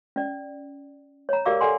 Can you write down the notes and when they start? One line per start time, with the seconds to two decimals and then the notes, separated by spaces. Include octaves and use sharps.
0.16 C#4 D5
1.29 C#5 A#5
1.46 G4 A#4 D5 F5 D6 E6
1.61 A4 D5 F#5 G#5 C6